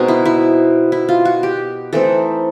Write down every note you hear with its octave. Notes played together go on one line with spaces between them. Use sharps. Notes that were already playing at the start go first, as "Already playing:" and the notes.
Already playing: B2 G#3 C4 D#4 F#4
E4
E4
E4
F4
F#4
G4
E3 A3 C4 D#4 A4